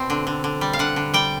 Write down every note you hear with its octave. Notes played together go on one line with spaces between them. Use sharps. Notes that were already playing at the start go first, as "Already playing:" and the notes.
Already playing: B2 C4
D3
D3
D3
G3
F5
D3 F#5
D3
G3 G5